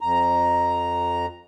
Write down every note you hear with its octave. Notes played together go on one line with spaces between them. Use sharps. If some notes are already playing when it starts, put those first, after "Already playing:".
F2 A#5